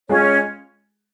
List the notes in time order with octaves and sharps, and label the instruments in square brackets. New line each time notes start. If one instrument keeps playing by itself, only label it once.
[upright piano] G#3 F4 G#4 [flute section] C#4 C#5